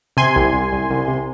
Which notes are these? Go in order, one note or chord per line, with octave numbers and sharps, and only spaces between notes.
C3 G#5 C6
C2
C2
C2
C2
C3